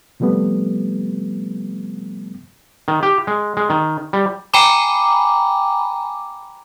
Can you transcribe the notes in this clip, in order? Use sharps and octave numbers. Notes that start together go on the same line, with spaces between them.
C3 F3 G3 A3 B3
D#3
G4
G#3
G#3
D#3
G3
G5 G#5 A#5 B5 D6